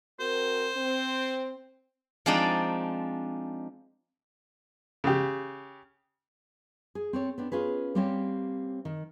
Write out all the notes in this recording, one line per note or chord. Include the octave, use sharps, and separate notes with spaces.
C4 F#4 A#4 C5
C4
F3 G#3 C4 D4 D#4 D5
C#3 G4
G#4
C4 A4 C#5
B3 C4 D4
C#4 F4 G#4 B4
G3 A#3 C4 C#4 G4 C#5
D#3